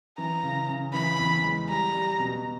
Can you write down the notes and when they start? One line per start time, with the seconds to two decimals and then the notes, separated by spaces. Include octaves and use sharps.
0.18 E3 A#5
0.43 C#3
0.68 C#3
0.93 E3 B5
1.19 E2
1.44 G#3
1.69 G3 A#5
1.95 G3
2.20 B2